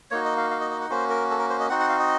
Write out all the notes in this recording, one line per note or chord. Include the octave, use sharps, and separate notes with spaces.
A#3 D#4 F#4 C#5
D#5
F5
F5
D#5
D#5
F#5
A#3 C#4 F#4 C5
A#4
A4
A#4
C5
D#5
C4 D#4 F#4 F#5
F#5
F5
D#5